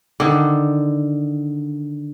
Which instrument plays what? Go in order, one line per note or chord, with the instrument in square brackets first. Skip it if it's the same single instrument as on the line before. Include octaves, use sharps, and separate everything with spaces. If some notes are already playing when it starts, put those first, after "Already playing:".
[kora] D3 D#3